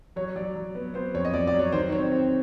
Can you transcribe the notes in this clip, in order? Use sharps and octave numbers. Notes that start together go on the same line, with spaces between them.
F#3 C#5
F#3 D5
F#3
B3
B3 C5
F2 C#5
D#5
F2 D5
D5
F#3
C#5
D#3 C5
C4 C#5
C4